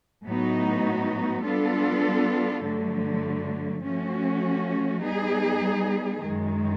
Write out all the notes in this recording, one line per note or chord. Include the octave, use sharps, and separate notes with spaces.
A2 F#3 B3 D#4 F#4
G3 B3 D4 F4 A4
G2 D3 F#3 A3
F3 A3 C#4 F#4
G3 B3 D#4 G#4
F#2 D#3 G#3